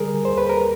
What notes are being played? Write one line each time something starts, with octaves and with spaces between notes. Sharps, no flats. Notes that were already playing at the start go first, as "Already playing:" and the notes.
Already playing: D3 G3 G#4 A#4
D#2 C5
B4
A#4